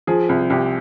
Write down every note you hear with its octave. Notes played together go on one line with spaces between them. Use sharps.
F3 G#4
C2
C2 G4